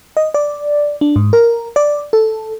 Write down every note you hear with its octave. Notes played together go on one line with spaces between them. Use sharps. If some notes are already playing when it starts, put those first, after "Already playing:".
D#5
D5
D4
G#2
A#4
D5
A4